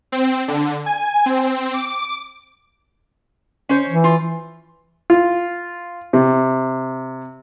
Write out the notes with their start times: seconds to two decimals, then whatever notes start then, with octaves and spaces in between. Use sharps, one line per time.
0.12 C4
0.48 D3
0.86 G#5
1.26 C4
1.74 D6
3.69 C#4 C5 C#5
3.89 E3
4.04 F4
5.10 F4
6.13 C3